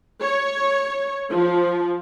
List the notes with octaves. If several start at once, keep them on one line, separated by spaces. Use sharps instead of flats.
C#5
F3